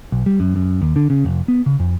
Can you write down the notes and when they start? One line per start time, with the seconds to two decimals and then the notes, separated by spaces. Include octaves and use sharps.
0.12 B1
0.26 G3
0.40 F#2
0.56 F#2
0.82 D#2
0.96 D3
1.10 C#3
1.25 F1
1.48 B3
1.66 C#3
1.80 F2